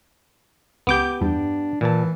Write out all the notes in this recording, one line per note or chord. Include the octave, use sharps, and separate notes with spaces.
C#2 B3 G4 D6 G6
E2 G2 D4
A#2 E3 A5